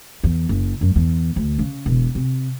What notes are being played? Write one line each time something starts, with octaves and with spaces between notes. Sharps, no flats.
E2
F#1
F#2
E2
D2
C#3
E1
C3